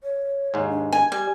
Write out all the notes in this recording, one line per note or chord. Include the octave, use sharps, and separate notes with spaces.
C#5
D#2 G#2
D4
G#5
G3 G4 G#5